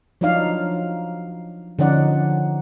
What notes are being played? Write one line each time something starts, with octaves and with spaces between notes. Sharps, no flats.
F3 F#3 D4 D#4 D5 F5
D3 F3 C#4 D#4 D5 F#5